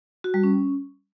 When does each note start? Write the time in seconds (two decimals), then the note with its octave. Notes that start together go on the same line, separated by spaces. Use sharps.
0.24 F#4
0.34 G3
0.44 C#4